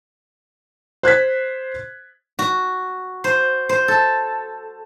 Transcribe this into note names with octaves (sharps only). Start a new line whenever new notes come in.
C5 F#6 G#6 B6
F#4
C5
C5
A4